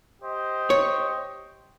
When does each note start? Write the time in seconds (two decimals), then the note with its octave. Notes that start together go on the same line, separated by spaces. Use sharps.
0.22 G4 C5 D#5
0.70 C#5